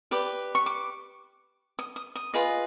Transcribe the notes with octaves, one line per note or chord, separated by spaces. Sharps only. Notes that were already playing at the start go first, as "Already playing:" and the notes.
G4 B4 D5 D6
C#6
D6
D#6
D#6
D#6
F4 G#4 B4 D#5